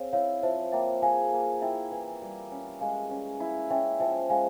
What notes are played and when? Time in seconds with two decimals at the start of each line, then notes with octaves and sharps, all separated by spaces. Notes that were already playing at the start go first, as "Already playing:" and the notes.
Already playing: C4 G#4 C#5 F5
0.13 E4 C#5 F5
0.43 F3 C5 E5
0.72 A#3 E5 G5
1.02 G#4 F5 G#5
1.33 A#3
1.61 E4 E5 G5
1.91 E3
2.22 G3
2.51 C#4
2.81 G#3 F5 G#5
3.11 C#4
3.40 E4
3.70 C#4 E5 G5
4.00 F3 E5 G5
4.30 G#3 F5 G#5